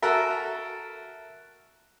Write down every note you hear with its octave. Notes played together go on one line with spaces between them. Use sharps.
F#4 A4 A#4 E5